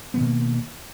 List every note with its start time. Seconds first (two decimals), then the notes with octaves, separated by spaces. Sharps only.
0.14 B3
0.17 D#3
0.20 B2
0.23 A#3